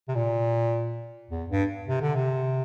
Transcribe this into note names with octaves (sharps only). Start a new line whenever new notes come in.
C3
A#2
E2
G2
C3
D3
C3